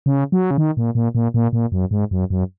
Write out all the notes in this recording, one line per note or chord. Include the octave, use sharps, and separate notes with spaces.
C#3
F#3
C#3
D#3
A#2
A#2
A#2
A#2
A#2
F#2
G#2
F#2
F#2